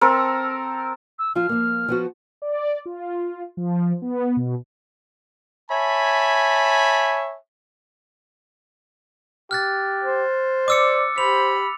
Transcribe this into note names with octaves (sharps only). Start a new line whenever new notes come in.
C4 A4 A#4
E6
F3 F4 F6
F3 A#3
F3 B3 F#4
D5
F4
F3
B3
B2
C#5 E5 G#5 A5 B5
G4 F6 F#6 A6
C5
D5 D6 E6 C#7
G4 C5 B5 F7